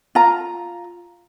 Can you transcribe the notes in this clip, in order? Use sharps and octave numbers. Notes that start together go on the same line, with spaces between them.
F4 A#5